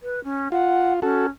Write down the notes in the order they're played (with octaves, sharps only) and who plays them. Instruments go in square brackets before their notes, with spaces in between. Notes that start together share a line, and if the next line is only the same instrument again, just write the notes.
[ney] B4
C#4
[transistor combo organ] F4 [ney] F#5
[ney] C#4 [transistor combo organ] F#4 A4